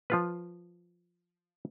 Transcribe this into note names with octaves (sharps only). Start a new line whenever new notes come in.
F3 F4 B4